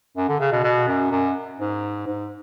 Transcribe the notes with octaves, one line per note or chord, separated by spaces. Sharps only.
F#2
D3
C#3
B2
B2
F#2
F#2
G#2
G#2